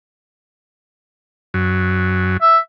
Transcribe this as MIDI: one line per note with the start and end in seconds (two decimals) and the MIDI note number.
1.54 2.37 42
2.41 2.57 76